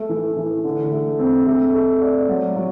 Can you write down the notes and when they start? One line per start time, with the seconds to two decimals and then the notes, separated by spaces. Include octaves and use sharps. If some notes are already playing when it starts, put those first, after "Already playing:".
Already playing: A3
0.09 E3
0.37 E3
0.64 D3
0.92 A3
1.19 C4
1.47 A3
1.74 A3
2.02 D5
2.28 F#3
2.56 F#3